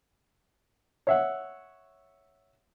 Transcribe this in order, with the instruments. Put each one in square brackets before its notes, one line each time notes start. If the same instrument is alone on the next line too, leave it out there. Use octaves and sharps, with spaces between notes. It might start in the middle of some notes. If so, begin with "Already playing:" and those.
[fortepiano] C#5 E5 F#5